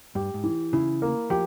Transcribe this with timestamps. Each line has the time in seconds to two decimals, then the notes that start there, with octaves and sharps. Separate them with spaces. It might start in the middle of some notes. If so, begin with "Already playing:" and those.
0.15 G2 G4
0.34 G#2
0.44 E3
0.73 C#3 E4
1.02 A#3
1.30 F3 G4